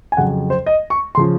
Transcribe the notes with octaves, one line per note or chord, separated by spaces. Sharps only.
G#5
F2 C#3 F#3 F#5
C5
D#5
C#6
C6
C#3 F3